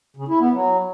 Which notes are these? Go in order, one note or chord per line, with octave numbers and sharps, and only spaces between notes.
C#3
E4
B3
F#3